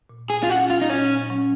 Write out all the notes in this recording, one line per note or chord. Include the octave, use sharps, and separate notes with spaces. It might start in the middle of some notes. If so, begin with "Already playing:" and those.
A#2
G#4
F4
F#3 C#4 F#4
F4
D#4
A#2 C#4
F#3 C#4